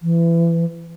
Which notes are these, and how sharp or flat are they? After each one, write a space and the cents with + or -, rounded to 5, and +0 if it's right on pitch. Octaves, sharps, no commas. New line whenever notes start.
E3 +25